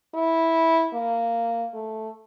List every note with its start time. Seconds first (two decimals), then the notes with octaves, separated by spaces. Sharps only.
0.14 E4
0.94 A#3
1.73 A3